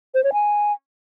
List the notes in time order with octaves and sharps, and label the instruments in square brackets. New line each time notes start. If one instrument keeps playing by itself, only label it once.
[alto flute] C5
C#5
G#5